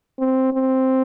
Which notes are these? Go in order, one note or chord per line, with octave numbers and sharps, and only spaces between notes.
C4
C4